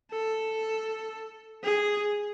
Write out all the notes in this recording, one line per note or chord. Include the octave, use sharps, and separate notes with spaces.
A4
G#4